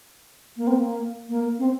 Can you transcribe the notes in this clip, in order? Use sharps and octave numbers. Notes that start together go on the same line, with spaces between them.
A#3
C4
A#3
A#3
C4